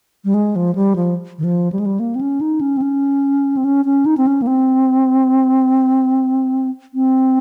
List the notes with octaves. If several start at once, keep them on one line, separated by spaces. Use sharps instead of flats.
G3
G#3
F3
G3
F3
D#3
F3
G3
G#3
G3
A#3
C4
C#4
D#4
C#4
C4
C#4
C4
C#4
C#4
D#4
C4
C#4
A#3
C4
C4